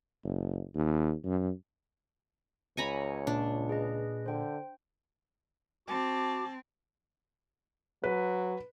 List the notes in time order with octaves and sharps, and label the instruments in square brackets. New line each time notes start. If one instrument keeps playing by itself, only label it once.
[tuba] F#1
D#2
F#2
[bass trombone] C#2 [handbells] C#5 C#7 [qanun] G#5 A#5 B5
[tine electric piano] A#2 [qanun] D4
[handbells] G#4 B4 D#5
[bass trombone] D3 [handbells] C5 G5
[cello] C4 [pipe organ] F#4 D6 [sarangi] A5
[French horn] F#3 [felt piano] B4